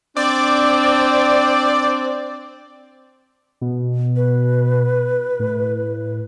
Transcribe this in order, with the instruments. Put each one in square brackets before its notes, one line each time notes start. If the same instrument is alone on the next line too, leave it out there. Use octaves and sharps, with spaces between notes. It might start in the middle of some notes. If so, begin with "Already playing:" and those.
[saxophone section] C4 D4 [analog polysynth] D5
[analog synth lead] B2
[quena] B4
[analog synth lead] A2